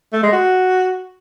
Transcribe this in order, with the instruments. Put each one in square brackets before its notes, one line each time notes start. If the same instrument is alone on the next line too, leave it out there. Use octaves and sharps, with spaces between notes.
[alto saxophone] A3
G#3
F#4